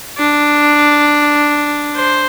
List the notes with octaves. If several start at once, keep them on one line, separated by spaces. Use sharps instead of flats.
D4
C5